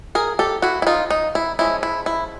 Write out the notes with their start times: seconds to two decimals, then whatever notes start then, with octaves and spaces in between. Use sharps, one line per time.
0.15 G#4 A#4
0.39 G4 A4
0.62 E4 F#4
0.82 E4
0.87 D#4 F4
1.10 D#4
1.35 E4
1.59 F3 G#3 C#4 E4
1.83 E4
2.06 E4